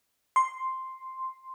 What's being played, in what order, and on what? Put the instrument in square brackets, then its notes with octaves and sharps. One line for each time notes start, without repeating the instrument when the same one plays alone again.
[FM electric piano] C6